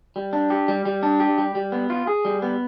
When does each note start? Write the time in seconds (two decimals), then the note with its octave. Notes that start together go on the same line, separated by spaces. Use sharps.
0.16 G3
0.33 D4
0.50 G4
0.68 G3
0.85 G3
1.03 D4
1.20 G4
1.38 G3
1.55 G3
1.72 B3
1.90 F4
2.07 G#4
2.25 G3
2.42 B3